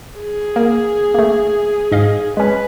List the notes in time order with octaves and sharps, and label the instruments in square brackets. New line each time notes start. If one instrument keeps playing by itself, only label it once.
[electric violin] G#4
[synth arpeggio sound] A#3
A3 A#3
G#2 D#5 F5
[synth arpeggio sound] G#3 C#4 [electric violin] B4